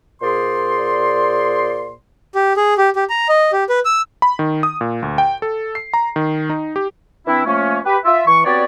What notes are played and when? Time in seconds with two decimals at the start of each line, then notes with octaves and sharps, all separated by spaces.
0.22 A#2 G#4 C5 D5 C6
2.35 G4
2.57 G#4
2.78 G4
2.96 G4
3.09 A#5
3.29 D#5
3.53 G4
3.69 B4
3.85 E6
4.22 B5
4.39 D#3
4.63 D#6
4.81 A#2
5.02 D2
5.18 G5
5.42 A4
5.75 C7
5.93 A#5
6.16 D#3
6.50 D#4
6.76 G4
7.26 E3 C4 D4 E4
7.46 F3 A3 A#3 C#4
7.85 G4 B4
8.05 F4 E5
8.26 E3 C#6
8.44 B3 C4 F#4 G4 C#5 D5